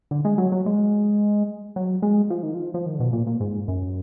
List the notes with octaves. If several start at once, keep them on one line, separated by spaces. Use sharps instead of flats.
D3
G#3
F#3
F#3
G#3
F#3
G#3
F3
D#3
F3
F3
D#3
D3
B2
A#2
A#2
G#2
F#2